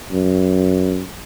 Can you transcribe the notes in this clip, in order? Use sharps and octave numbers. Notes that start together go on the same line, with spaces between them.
F#2